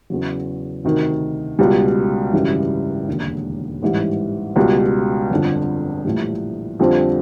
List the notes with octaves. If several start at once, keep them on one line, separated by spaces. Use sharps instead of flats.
E2 C#3 F#3
D2 C3 D#3
C#2 B2 G3
G#1 F#2 C#3 E3 G3
E1 D#2 D3
A1 G#2 E3 G3
C#2 B2 G3
G1 F2 D3
A#1 A2 E3 G3
F2 D3 G3 C4 F4